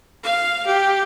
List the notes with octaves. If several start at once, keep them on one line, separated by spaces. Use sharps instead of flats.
F5
G4